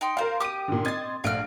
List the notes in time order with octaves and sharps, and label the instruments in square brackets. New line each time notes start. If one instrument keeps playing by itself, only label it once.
[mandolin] D#4 G5 C6
[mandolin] F4 C5 [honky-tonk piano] A#4 F5
[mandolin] G4 D#6 [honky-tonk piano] D6 D#7
[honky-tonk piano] A#2 D3
[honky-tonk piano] C4 G#6 A6 [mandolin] D#5 C6
[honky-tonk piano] A#1 A3 D7 [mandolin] F5 F#5 F6